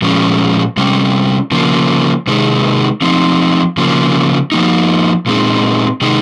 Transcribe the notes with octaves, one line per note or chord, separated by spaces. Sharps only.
A#2 F3 G#3 C#4
C3 G3 C#4
C#3 F3 A#3
C3 D#3 G#3 D#4
F3 C4 D#4
C#3 F3 A#3
F3 A#3 D#4
A#2 G#3 C4 D#4
C3 D#3 G#3 D#4